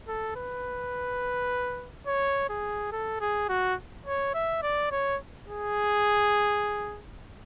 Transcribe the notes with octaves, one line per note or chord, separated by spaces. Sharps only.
A4
B4
C#5
G#4
A4
G#4
F#4
C#5
E5
D5
C#5
G#4